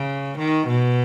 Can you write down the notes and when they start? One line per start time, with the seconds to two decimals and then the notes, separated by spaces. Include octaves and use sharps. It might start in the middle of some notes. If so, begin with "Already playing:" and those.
Already playing: C#3
0.39 D#3
0.68 B2